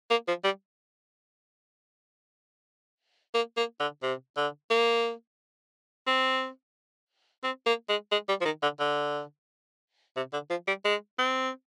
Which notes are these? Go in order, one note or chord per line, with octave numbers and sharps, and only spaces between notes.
A#3
F3
G3
A#3
A#3
D3
C3
D3
A#3
C4
C4
A#3
G#3
G#3
G3
F3
D#3
D3
D3
C3
D3
F3
G3
G#3
C4